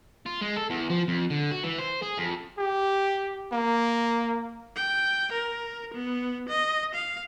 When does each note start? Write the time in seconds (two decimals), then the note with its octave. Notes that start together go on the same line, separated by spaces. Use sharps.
0.26 F4
0.42 G#3
0.57 A4
0.70 E2
0.90 F3
1.08 F2
1.30 D3
1.51 F#4
1.64 E3
1.79 C5
2.03 G#4
2.18 F2
2.58 G4
3.52 A#3
4.76 G5
5.32 A#4
5.94 B3
6.49 D#5
6.95 F5